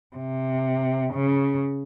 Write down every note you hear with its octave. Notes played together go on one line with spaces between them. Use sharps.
C3
C#3